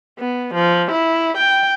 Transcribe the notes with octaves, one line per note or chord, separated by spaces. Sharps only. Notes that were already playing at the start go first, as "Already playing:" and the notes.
B3
F3
E4
G5